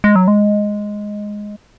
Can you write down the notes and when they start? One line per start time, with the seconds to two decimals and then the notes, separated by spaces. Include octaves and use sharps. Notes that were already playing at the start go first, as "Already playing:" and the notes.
0.04 G#3
0.16 F#3
0.28 G#3